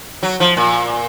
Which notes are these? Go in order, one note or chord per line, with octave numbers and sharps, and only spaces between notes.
F#3
F3
A#2